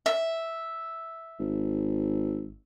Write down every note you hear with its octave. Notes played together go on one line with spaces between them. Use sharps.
E5
G#1